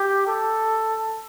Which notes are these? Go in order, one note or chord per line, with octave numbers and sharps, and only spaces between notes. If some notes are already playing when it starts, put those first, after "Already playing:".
Already playing: G4
A4